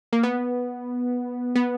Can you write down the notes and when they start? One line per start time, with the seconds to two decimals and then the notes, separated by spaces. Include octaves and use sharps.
0.13 A#3
0.23 B3
1.55 B3